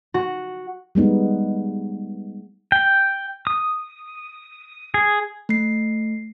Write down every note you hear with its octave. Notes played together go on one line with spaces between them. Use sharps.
F#4
G3 G#3 B3 D#4
G5
D#6
G#4
A3 C7